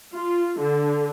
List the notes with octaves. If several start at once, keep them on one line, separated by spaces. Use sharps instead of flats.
F4
D3